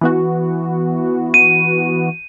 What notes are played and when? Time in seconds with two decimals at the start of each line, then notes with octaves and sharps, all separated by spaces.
0.01 E3 B3 F#4
1.34 D#7